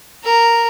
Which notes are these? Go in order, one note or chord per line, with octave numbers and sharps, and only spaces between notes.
A#4